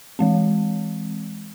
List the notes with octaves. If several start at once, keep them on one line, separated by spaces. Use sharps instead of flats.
E3 G#3 C4